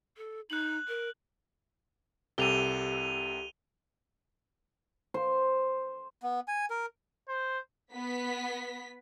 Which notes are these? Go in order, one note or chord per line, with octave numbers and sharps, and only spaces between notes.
A4
D#4 F#6 F#7
A#4
C2 C3 G4 A4 D#7 F7 G7
C5
B3
G#5
A#4
C5
B3 B6